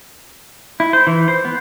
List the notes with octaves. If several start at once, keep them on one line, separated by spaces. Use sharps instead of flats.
E4
C5
E3
C5
B3